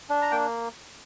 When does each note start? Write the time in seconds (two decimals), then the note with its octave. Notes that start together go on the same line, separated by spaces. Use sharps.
0.10 D4
0.22 A#5
0.32 A#3 G5